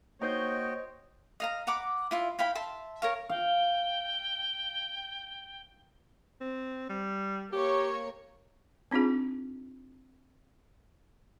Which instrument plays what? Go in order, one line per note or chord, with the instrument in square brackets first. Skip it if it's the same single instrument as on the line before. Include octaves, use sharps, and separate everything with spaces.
[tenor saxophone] A#3 [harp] D#4 C5 G6 [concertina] F#4 D#5 G5 [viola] C#5
[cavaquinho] D#5 F5 A#5
F#5 A#5 B5 D6
E4 F4 E5
E4 F5 G5 B5
E5 A5 C6
A#4 C#5 F5
[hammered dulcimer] F5 [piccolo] G5
[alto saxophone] C4
G3
[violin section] A#3 C#5 [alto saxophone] G4
[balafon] C4 D4 D#4 F4 G#4